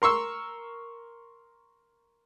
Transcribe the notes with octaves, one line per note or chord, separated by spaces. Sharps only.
A#4 C6 C#6 E6